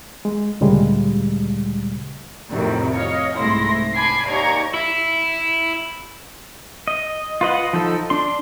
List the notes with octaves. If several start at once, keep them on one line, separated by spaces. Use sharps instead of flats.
G#3
D2 A#2 C#3 G3 G#3
F2 A2 C3 D#3 F#3 G3
C#5 D#5 F5
C2 G#2 A3 E4 C6 A#6
G#5 A5 B5 D6 G#6 C7
D#2 G4 D5 A#5 C#6 G#6
E4
D#5
F4 B4 D#5 F#5
F3 D#4 A4
D4 C6